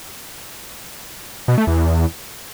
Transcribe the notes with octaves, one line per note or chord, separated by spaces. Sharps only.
B2
A3
E2